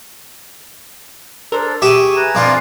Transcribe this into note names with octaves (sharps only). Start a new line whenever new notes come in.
D4 A4 A#4 C5
G4 G#4 E5 C#6 D#7 E7
B4 G#5 A#5
F2 D4 F4 F5